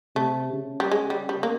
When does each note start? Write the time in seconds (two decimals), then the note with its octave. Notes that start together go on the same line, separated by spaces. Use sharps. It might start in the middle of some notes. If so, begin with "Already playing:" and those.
0.16 C3 A3
0.53 C#3
0.80 G3
0.91 G#3
1.10 G3
1.29 G3
1.43 A#3